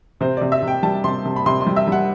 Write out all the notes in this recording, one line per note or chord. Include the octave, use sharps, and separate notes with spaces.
C3 C5
C3 D5
E5
C3
G5
G3 A5
C3 C6
C3
B5
C3 C6
C6
G3
E5
G3 F#5